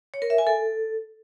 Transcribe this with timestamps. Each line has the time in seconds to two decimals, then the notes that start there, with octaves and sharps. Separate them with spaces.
0.14 C#5
0.22 A#4
0.30 E5
0.38 G#5
0.47 A4